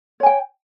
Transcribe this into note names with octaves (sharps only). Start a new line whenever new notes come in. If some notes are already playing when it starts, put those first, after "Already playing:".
C#5 G5 G#5